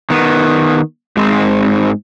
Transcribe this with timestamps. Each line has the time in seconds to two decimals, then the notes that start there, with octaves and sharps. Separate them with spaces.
0.10 D#3 B3
1.17 G#2 G#3 C4